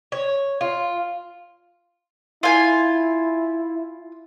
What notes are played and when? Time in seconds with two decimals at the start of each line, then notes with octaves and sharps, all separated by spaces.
0.12 C#5
0.61 F4
2.43 E4 F4 G#5